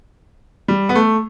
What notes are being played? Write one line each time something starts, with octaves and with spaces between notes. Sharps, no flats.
G3
B3
A3